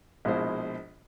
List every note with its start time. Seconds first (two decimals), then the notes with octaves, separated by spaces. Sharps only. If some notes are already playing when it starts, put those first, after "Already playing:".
0.25 A#1 B2 G#3 E4 F4 C5